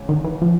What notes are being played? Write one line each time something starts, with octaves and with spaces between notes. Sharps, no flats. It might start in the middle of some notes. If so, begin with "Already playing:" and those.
Already playing: E2 C#3 G#3 C#4
D#3
E3
F3